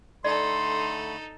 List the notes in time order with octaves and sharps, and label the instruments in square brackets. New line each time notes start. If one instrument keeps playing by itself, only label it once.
[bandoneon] D3 A3 B5 [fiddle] D#4 A4 [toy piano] D5 [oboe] C6